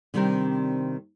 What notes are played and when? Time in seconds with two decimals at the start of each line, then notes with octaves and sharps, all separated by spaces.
0.14 C3 D#3 G3 C4 D4 A#4